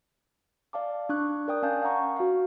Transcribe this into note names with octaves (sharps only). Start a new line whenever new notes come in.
D5 F5 A5 D6
D4 C#6 F#6
A#4 D5 G5 D#6
C#4 F5 G#5 A5 G6
F5 F#5 A#5 C#6
F#4 F5